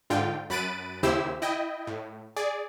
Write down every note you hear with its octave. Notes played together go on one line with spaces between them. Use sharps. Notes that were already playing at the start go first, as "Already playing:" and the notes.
G#2 D3 F4 G5
F#2 B5 F#6 A6 D7 D#7
D#2 C#3 E4 G4 C5 E6
E4 D#5 G5
A2
G#4 D5